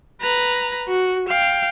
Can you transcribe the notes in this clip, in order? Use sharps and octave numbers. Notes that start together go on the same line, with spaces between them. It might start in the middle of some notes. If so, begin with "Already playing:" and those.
B4 A#5
F#4
F5 G5